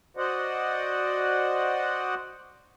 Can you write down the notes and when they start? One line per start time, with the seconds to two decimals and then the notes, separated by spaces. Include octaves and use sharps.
0.17 F#4 C5 D5 D#5 F#5